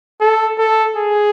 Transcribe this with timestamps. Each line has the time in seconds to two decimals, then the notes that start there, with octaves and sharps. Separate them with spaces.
0.21 A4
0.59 A4
0.97 G#4